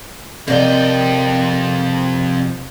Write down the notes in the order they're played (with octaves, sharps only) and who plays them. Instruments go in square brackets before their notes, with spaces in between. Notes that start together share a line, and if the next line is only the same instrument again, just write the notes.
[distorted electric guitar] F2 G5 [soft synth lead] C3 [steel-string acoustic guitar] A#4 D5 D#5